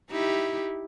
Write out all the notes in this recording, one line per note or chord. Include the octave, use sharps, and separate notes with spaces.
D#4 E4 G4